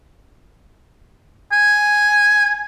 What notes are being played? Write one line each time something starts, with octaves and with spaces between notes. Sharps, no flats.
G#5